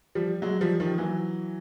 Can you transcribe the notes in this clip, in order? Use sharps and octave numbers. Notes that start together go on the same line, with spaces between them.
F3 G3
F#3 G#3
F3 G3
D#3 F3
E3 F#3